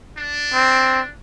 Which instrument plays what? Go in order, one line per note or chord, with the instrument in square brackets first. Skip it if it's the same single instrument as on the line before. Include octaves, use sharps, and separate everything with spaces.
[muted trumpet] D4
[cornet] C4